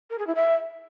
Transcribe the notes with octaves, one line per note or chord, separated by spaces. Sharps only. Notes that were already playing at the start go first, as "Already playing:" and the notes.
A#4
G#4
E4
E5